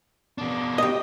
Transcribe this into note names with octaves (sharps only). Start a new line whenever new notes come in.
B2 D4
G4 D#5